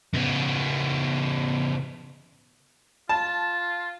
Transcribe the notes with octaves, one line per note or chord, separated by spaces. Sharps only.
C#3 B3
F4 A5